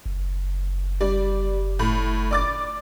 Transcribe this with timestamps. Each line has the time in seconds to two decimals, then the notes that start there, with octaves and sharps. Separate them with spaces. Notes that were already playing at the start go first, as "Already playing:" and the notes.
0.06 F#1
1.00 G3 D5
1.79 A2
2.31 D5 D6 A6